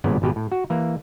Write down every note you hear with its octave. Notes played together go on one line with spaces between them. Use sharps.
G#1 G2 A#2 C#3 B3 D5
G#1 B2 G4 B4
A2
F#4
E3 A#3